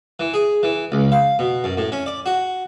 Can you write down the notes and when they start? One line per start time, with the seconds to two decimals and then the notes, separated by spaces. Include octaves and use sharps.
0.19 E3
0.34 G#4
0.63 E3
0.92 C#2
1.12 F5
1.39 B2
1.64 F#2
1.77 A2
1.92 C#4
2.06 D5
2.26 F#4